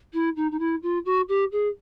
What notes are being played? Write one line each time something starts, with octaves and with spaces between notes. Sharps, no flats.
E4
D#4
D#4
E4
F4
F#4
G4
G#4